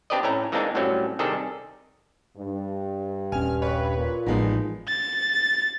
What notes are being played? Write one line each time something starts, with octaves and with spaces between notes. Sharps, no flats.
C4 D4 G4 B4 D5 D#5
A2 A3 C#4 A#5
E3 G#3 A#3 C4 D4 D#4
A2 F#3 G3 A3 C4 C#4
C3 D#3 G3 D4 G#4 A4
G2
D#1 C#4 G#5 F6
B4 C#5 C#6
A#2 F4
A1 F3 G#3 B3 D#4
A6